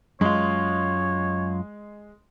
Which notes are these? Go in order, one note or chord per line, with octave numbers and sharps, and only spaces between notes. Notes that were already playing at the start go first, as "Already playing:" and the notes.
F#2 G#3 F4 C#5